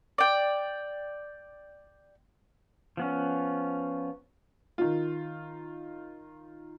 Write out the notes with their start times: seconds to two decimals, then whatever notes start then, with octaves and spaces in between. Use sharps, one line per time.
0.18 D5 G5
2.97 F3 B3 C#4
4.78 D#3 F4